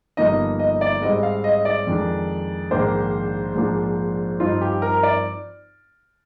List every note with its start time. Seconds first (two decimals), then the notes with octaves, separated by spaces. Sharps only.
0.17 G1 G2 F3 A#3 D#4 D#5
0.59 D#5
0.81 D5
1.02 G#2 G3 C4 D#5
1.23 F5
1.44 D#5
1.65 D5
1.87 F2 D#3 G#3 D4
2.71 A#1 G#2 D#3 A#3 D4 C5
3.55 A#1 G#2 F3 A#3 D4
4.40 G2 F3 C4 D#4 F4
4.61 G4
4.82 A#4
5.03 D5